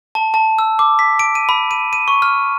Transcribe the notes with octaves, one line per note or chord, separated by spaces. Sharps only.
A5
A5
E6
D6
B6
D7
D#7
B5
D#7
D#7
C#6
F6